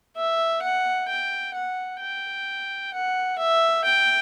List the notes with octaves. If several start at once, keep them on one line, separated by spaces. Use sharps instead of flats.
E5
F#5
G5
F#5
G5
F#5
E5
G5